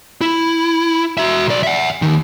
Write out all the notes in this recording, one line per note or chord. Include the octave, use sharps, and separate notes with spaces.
E4
F#4 E5
B1 D5
E5 F#5
D#2 D#3